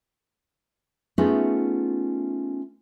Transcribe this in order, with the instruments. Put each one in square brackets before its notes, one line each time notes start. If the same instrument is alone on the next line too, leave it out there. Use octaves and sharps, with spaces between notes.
[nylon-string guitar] A3 B3 C#4 D#4 F4 G#4